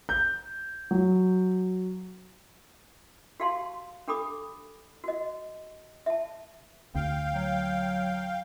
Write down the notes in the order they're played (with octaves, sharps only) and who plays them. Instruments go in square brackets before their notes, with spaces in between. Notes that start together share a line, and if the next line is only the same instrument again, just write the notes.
[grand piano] G6
F#3
[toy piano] F#4 G4 F5 A5 C6
D4 G4 A4 B5 D6 D#6
F#4 D#5
E5 A5
[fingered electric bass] D2 [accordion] F5 G5
[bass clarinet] F#3